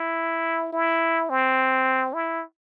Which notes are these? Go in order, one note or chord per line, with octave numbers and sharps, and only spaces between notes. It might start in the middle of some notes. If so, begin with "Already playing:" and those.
Already playing: E4
E4
C4
E4